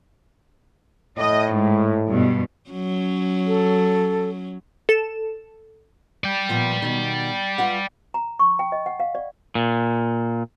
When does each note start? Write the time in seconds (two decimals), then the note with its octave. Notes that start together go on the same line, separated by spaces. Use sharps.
1.18 A2 D#5
1.52 G#2
2.07 G2 B2
2.70 F#3 C#4
3.47 A4
4.89 A4 E7
6.24 D5 G5
6.49 A#2 F3 B3
6.82 B2 D#3
7.58 F4 B4 F#5
8.14 A#5
8.39 C#6
8.59 G5
8.72 D#5
8.86 F#5
9.00 F5
9.15 D5
9.55 A#2